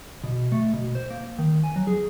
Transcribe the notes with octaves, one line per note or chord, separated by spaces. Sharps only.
B2
A3
B2
C5
A#3
D#3
G#5
F#3
G#4